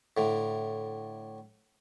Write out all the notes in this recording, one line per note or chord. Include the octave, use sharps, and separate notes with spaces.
A2 D3